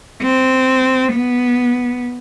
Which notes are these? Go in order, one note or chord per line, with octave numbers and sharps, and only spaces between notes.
C4
B3